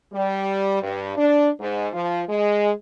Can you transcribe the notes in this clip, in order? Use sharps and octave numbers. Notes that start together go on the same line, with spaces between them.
G3
G2
D4
G#2
F3
G#3